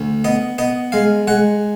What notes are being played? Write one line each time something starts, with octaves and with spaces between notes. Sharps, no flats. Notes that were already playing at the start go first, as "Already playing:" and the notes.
Already playing: D2
B3 D#5
B3 D#5
G#3 F5
G#3 F#5